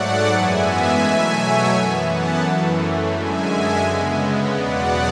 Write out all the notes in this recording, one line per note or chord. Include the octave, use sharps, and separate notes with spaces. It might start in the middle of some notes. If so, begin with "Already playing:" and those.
Already playing: G#2 F#3 A3 D5 F#5
F#2 E3 G#3 B3 E5 G#5
B2 F#3 A3 E5 G#5
C#5 E5
F#2 E3 B3
F#5 A5
F#2 E3 A3
F#2 D3 G#3 E5 G#5
C#3 G#3 B3
E2 B2 F#3 B3 D5 F#5